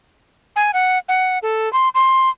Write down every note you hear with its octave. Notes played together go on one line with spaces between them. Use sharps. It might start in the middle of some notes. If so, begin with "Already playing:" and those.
G#5
F#5
F#5
A4
C6
C6